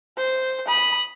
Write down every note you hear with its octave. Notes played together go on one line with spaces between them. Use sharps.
C5
B5 D#6